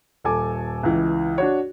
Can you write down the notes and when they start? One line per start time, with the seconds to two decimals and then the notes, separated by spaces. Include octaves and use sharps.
0.24 D#1 A4 G#5 D6
0.83 C#2 E3
1.38 D4 F#4 C#5